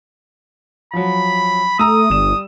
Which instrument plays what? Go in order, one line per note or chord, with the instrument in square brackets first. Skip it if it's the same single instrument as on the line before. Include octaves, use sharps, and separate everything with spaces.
[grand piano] F3 F#3 [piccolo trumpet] B5
[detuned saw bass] A3 [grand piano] A#5 E6 [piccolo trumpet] D#6
[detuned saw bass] G1 [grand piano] G3 E7